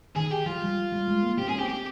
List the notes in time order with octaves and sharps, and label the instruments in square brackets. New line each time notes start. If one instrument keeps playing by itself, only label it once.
[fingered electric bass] D#3 [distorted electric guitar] G#4
[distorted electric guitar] G4
[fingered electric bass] F3 [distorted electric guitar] F4
[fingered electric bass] G3
G3
G#3
A#3
[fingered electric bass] C4 [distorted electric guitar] G4
[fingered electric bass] C#4 [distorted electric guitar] G#4
[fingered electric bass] A#3
[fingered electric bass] C4 [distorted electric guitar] G4
[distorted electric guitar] G4